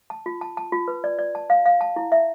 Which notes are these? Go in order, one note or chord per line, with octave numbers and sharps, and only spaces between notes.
A5
F4
A5
A5
F4
B4
D5
D5
A5
F5
F5
A5
E4
E5